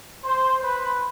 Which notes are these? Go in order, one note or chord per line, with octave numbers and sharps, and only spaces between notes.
C5
B4